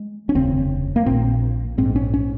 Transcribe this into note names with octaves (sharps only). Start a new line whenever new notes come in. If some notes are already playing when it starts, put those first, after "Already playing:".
Already playing: G#3
C#4
F1 D#2 C#3 C4
A#3
A#1 A#2 C4
A#1 G#2 C4
C#4
C#4